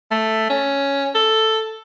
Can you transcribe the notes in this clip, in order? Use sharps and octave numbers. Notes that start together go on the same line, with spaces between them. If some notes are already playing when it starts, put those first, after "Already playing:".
A3
C#4
A4